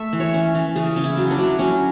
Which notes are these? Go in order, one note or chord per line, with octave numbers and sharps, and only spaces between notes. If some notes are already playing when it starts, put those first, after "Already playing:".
Already playing: A3 E5
E3
C#5
C#4
E3
C#3 G#4
C#3
E4
F#3
D4
F#3
F#3 C#4